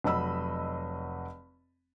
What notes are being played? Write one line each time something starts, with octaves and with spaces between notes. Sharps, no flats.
F1 F#3 D#5 B5 E6